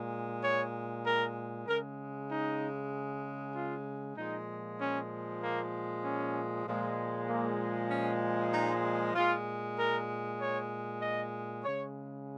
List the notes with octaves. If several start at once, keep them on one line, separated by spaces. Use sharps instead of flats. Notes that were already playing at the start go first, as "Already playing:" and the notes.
Already playing: A#2 G#3
C#5
A#4
C#3 G#3 A#4
D#4
F4
A#2 F3 G#3 D#4
C#4
A#3
C#4
A#2 F3 G#3
A#3
C#4
D#4
A#2 G#3 F4
A#4
C#5
D#5
C#3 G#3 C#5